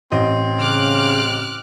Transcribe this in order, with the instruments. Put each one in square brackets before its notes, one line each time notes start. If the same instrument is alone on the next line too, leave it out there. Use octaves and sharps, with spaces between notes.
[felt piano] A1 D#5 [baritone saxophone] C4
[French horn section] C#3 [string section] D6 F6 F#6